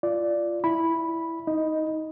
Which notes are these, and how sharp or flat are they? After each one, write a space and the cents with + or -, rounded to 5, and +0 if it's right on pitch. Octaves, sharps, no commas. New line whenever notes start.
F4 -20 D5 +0
E4 +0 B5 -5
D#4 +20 D#5 +0